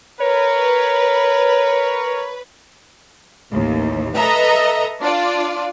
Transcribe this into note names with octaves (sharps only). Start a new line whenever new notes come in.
A#4 B4 C#5
A1 D#2 A2
A4 B4 D#5 E5 A#5
D4 F4 D5